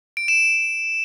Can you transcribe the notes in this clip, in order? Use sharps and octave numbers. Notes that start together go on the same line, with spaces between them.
D7
E7